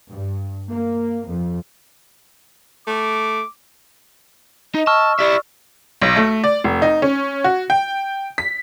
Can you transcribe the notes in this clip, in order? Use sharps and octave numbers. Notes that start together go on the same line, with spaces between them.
G2
A#3
F2
A3 D6
D#4 D#5
A5 C#6 E6 F6
E4 G4 D5 E5
B1
A3
D5
F1
D#4
C#4
F#4
G5
B6